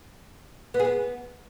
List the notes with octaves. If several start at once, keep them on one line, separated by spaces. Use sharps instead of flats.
B3
G#4
B3